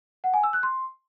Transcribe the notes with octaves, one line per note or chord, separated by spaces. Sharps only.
F#5
G#5
E6
F#6
C6